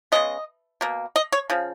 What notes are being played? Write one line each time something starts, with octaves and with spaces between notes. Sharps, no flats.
C#3 G#3 B3 D#5
B2 A#3
D#5
C#5
C#3 F3